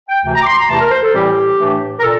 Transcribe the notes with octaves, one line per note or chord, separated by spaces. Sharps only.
G5
D2 C3 E3
A#5
D6
C6
A#5
E2 C3 E3 A3 E4 A5
A#4
C5
A4
A2 E3 G3 C4 E4 G4
A2 E3 A3 D4
A#4
A#2 A4